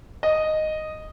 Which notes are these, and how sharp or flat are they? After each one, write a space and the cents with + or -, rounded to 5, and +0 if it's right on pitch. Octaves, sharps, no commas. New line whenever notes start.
D#5 -5